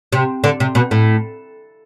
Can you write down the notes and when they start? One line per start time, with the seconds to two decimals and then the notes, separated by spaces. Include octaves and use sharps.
0.12 C3
0.44 D3
0.60 C3
0.75 B2
0.91 A2